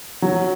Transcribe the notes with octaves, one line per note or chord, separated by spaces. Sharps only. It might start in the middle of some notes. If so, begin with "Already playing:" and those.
F#3